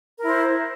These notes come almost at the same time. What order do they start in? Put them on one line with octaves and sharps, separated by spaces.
A#4 E4 C5